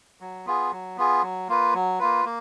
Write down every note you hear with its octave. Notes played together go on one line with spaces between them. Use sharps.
F#3
B3 F4 G#4
F#3
B3 F4 G#4
F#3
A#3 F4 B4
F#3
A#3 F4 B4
A#3